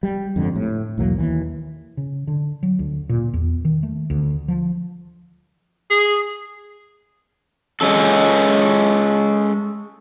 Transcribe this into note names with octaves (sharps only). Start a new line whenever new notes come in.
G3
F2 G#2 D3
A2
B1 E2 F#3 A#3
D#2 E3
C#3
D3
F#3
D2
A#2
E2
D#3
A3
D2
F3
G#4
G#3 C#4 A4